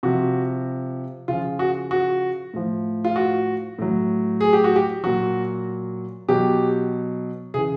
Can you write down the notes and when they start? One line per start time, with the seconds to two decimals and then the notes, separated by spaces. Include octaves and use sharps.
0.03 C3 F3 F#4
1.28 C#3 F3 F4
1.59 F#4
1.91 F#4
2.54 A2 F3
3.05 F4
3.16 F#4
3.78 A2 F#3
4.41 G#4
4.53 G4
4.64 F#4
4.76 G4
5.03 A#2 F#3 F#4
6.28 B2 F#3 G4
7.54 C#3 E3 G#4